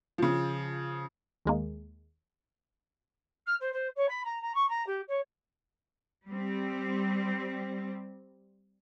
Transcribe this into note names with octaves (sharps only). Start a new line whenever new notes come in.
C#3 F3
D#2 G#3 A#3
F6
C5
C5
C#5
B5
A#5
A#5
C#6
A#5
G4
C#5
G3 C4